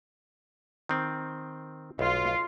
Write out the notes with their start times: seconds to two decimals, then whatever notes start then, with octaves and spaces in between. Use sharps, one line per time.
0.89 D#3 C4
1.99 B1 F4